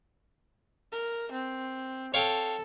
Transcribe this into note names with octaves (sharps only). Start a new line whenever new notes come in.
A#4
C4
A4 C#5 F5 G5